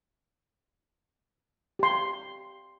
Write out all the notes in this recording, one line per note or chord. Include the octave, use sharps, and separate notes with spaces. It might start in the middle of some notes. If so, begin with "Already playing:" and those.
G4 C6